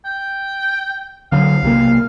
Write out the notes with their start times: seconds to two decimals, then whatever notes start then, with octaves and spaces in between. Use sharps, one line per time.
0.05 G5
1.32 D3 F#3 F5
1.62 B1 C3 A#3